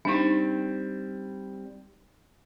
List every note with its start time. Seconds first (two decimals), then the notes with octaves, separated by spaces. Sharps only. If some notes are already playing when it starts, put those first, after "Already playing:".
0.05 G3 C4 D4 D#4